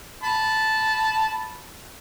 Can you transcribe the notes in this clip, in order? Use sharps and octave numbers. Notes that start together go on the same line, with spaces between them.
A5 B5